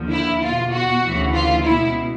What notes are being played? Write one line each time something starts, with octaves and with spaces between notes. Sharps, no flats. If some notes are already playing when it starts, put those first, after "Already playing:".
Already playing: D#2 D3 F3
E4
E2 B2 F4
F#4
D2 C#3 E3
F4
C#2 B2 E4